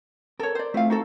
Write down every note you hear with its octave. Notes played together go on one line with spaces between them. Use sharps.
A4 A#4 C#5
C5 D5
A3 C4 E4 F4 F5
D#4 F#4 A4